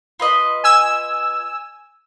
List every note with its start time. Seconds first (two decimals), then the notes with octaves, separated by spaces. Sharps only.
0.20 F4 B4 D#5
0.64 G#5 E6